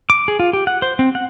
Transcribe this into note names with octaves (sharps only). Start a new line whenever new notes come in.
D6
G#4
F4
G4
F#5
C5
C4
F#5